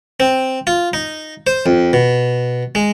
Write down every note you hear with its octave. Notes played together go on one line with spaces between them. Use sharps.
C4
F4
D#4
C5
F2
B2
G#3